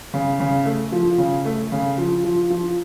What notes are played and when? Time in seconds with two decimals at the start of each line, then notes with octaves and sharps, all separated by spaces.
0.14 C#3
0.40 C#3
0.65 A3
0.92 F3
1.18 C#3
1.45 A3
1.72 C#3
1.98 F3
2.24 F3
2.50 F3